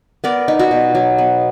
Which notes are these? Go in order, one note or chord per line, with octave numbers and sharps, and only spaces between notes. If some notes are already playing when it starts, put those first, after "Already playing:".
B3 A#4 D5
D#4
F#4
B2
F#3
B3